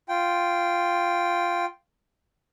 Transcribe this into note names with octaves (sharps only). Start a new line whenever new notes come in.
F4 G5